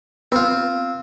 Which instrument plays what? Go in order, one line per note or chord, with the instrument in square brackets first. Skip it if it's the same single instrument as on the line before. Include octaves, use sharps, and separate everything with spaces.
[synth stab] B3 [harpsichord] C4 F4